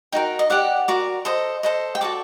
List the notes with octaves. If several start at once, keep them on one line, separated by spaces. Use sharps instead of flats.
D#4 F#4 A#4 G5
D#5
G4 D5 F#5
F#4 A#4 D5
A4 C5 D#5
A4 C5 D#5
G5
F#4 A4 D5 A5